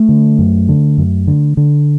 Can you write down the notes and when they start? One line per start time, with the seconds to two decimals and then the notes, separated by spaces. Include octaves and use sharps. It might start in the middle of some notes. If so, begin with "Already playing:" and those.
Already playing: A3
0.09 D3
0.39 F#2
0.69 D3
0.98 F#2
1.27 D3
1.57 D3